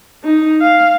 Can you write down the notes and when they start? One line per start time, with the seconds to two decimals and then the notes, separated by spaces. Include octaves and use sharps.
0.24 D#4
0.61 F5